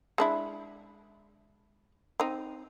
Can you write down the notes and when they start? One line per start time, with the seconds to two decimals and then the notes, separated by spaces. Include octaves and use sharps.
0.18 G#3 D4 E4
2.20 C4 D#4